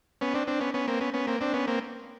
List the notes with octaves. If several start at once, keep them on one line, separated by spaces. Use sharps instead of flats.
B3 C#4
C4 D4
C4 D4
B3 C#4
B3 C#4
A#3 C4
B3 C#4
B3 C#4
A#3 C4
C4 D4
B3 C#4
A#3 C4